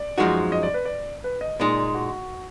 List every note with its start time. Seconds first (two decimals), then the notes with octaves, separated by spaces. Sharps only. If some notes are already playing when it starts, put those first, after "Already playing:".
Already playing: D5
0.18 F#2 F3 G#3 D#4 F#4
0.52 D#5
0.63 D5
0.74 B4
0.85 D5
1.24 B4
1.41 D#5
1.60 A#2 G#3 D#4 D5
1.94 F#4